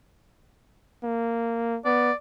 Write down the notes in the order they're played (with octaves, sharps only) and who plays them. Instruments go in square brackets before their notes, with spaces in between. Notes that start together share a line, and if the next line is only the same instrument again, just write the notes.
[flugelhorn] A#3
[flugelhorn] B3 [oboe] D5